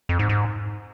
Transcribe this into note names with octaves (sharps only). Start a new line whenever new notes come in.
F2
G#2
G#2